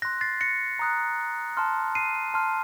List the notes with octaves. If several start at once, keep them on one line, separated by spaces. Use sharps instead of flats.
C6 F#6 A#6
A6 C7
A#6 C#7
A#5 D#6 F#6
A5 C6 F6
C7 D#7
A5 C6 F6